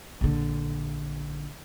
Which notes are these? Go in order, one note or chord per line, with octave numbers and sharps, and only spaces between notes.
A#1 D3